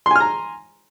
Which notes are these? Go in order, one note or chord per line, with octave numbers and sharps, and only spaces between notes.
G#5 A#5 C6 F6